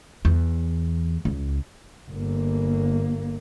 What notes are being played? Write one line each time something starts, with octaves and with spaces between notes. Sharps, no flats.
E2
C#2
G1 A#3